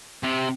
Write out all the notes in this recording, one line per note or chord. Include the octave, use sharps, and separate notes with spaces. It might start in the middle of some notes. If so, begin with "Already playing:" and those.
C3